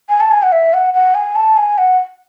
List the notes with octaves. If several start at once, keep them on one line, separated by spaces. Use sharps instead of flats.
G#5
A5
G#5
F#5
E5
F#5
F#5
G#5
A5
G#5
F#5